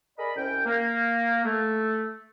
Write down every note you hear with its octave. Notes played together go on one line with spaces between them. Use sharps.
G#4 A#4 D5 D#5 B5
C2 C#4 G5
A#3
A3